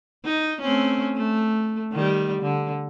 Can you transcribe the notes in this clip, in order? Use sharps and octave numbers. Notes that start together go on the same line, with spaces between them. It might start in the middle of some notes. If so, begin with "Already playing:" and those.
D#4
A3 C4 C#4
A3
D#3 G3
D3